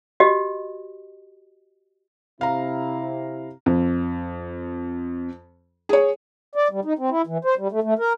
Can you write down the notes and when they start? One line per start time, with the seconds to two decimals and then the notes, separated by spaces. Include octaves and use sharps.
0.20 F#4 G4 D#5
2.41 C3 E4 F5 A#5
3.66 F2
5.89 G#4 C#5
6.55 D5
6.71 G3
6.85 D#4
6.99 C4
7.10 E4
7.27 E3
7.45 C5
7.58 G3
7.72 A3
7.83 A3
7.99 A#4